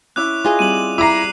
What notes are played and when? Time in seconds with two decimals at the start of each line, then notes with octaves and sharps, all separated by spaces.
0.16 C#4 E4 D6 F#6
0.44 F4 G#4 D#5
0.59 G3 C4 D#7 F#7
0.98 E4 A#5 D6 C7